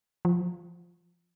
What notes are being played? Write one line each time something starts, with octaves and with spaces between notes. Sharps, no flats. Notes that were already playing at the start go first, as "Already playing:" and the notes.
F3